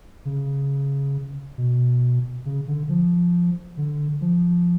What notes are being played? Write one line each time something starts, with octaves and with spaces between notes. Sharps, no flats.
C#3
B2
C#3
D3
F3
D3
F3